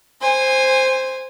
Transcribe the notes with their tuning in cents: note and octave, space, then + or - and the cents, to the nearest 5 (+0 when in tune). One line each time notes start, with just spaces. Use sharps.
C5 +0 G#5 -20